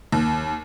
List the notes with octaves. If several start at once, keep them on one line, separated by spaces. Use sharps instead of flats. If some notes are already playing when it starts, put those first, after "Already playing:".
D#2